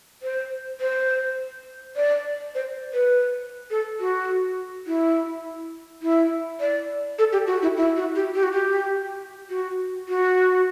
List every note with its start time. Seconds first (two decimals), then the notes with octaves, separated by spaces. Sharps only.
0.23 C5
0.81 C5
1.97 D5
2.55 C5
2.93 B4
3.71 A4
4.00 F#4
4.87 E4
6.02 E4
6.60 D5
7.19 A4
7.33 G4
7.47 F#4
7.62 E4
7.77 E4
7.96 F#4
8.15 G4
8.34 G4
8.43 F#4
8.52 G4
9.50 F#4
10.09 F#4